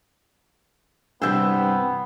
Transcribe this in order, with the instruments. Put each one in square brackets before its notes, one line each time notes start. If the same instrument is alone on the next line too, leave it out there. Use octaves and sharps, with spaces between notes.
[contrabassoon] G2 [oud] C3 E3 C4 [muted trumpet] B3 [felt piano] E6 G6